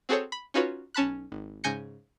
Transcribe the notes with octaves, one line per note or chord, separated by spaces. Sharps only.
C4 F#4 G#4 A4 C5 C#5
B5
C#4 D#4 F4 F#4 B4 C#5
B1 C#4 A5 B5 F#6
G#1
G#2 C#3 G#5 G6 A#6 C#7